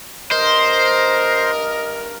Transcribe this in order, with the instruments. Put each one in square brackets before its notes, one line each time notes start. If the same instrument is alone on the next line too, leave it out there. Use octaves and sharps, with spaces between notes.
[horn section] G2 A#4 [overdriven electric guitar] C5 [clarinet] D#5